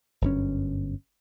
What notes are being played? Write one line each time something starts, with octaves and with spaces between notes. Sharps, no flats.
G1 F#2 C#4